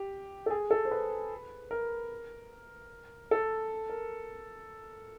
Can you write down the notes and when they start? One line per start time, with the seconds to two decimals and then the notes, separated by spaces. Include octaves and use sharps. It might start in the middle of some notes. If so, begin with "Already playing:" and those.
Already playing: G4
0.46 A4
0.51 G#4
0.71 A4
0.85 C5
0.91 B4
1.71 A#4
3.31 A4
3.89 A#4